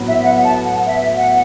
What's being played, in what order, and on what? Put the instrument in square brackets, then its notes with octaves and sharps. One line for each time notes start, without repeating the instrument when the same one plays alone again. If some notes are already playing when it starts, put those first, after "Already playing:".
Already playing: [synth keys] A2 F#3 B3
[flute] E5
F#5
A5
F#5
E5
F#5